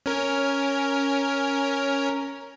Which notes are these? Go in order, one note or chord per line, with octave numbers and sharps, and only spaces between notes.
C#4 A#4